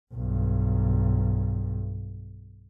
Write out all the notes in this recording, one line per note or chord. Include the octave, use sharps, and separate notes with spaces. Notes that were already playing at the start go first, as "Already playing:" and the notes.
B1 G2